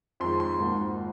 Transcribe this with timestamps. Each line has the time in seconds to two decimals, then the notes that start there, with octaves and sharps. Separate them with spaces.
0.20 F2 D#3 G#3 C6
0.40 C6
0.58 G#1 G#2 D#3 A#3